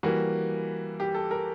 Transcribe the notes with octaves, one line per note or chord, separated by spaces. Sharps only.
E3 G3 A#3 F#4
G4
A4
A#4